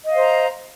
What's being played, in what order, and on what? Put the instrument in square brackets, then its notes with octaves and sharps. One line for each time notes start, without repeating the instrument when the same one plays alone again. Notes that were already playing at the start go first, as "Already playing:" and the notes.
[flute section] D#5
F5
C5
A#5